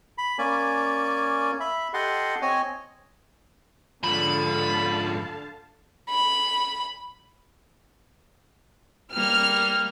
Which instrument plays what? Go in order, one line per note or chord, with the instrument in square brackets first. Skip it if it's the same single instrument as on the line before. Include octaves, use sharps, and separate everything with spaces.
[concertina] B5
A#3 C#4 D5 G#5
E5 B5
G4 A4 D#5 F#5 C6
C4 C#5 D#5 G#5
[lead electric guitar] G#2 F3 [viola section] D3 F5 A5 [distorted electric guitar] B5
[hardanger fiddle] B5
[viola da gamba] G3 A#3 [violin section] F6